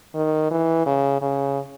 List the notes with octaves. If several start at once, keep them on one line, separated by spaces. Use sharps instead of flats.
D#3
E3
C#3
C#3